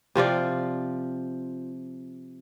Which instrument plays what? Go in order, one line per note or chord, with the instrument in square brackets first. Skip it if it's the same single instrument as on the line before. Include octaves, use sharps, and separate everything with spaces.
[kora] C3 F3 F4 D5